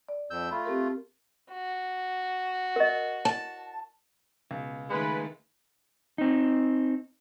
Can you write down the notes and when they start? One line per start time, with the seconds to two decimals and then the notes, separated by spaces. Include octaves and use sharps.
0.09 D5
0.31 F2 E6 G6
0.51 A3 F4 B5
0.66 C4 G4 A#4
1.50 F#4
2.76 A#4 D#5
3.25 A5
4.51 C#2 B2
4.90 D#3 G#3 A3 B4
6.18 C4 D#4